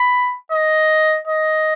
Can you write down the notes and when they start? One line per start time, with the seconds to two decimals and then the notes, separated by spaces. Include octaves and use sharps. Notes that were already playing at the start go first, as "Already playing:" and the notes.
Already playing: B5
0.52 D#5
1.28 D#5